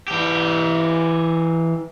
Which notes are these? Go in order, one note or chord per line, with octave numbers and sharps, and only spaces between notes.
E3 G4